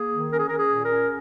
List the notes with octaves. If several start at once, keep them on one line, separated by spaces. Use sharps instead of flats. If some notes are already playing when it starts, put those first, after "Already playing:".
Already playing: A#3 G#4
D#3
C#4 A#4
G#4
C#4 A#4
G#4
A#2
A#4
C#4